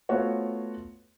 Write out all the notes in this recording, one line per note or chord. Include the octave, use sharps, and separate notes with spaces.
A3 B3 F4 F#4 C5 C#5